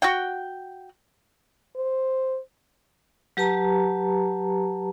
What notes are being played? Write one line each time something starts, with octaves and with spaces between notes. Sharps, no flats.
F#4 F#5 G5
C5
F#3 G4 B4 A5 A#5